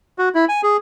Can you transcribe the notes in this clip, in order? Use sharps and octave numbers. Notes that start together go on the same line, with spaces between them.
F#4
E4
G#5
G#4